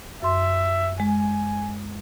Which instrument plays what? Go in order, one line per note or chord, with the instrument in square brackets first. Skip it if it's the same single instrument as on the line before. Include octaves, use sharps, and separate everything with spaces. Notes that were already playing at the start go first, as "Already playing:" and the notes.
[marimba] F#2 C6 [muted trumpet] E5
[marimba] G#3 [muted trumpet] G#5